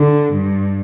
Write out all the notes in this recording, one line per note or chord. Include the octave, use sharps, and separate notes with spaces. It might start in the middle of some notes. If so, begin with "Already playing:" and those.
Already playing: D3
G2